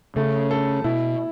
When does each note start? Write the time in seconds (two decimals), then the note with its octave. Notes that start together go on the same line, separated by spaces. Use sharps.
0.16 C#3 A3
0.51 A4
0.84 B2 E4